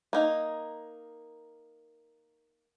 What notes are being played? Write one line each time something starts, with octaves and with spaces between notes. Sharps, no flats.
A#3 D#4